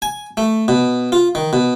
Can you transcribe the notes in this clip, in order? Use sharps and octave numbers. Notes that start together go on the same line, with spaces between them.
G#5
A3
B2
F4
D#3
B2